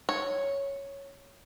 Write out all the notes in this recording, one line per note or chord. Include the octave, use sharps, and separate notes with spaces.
C#5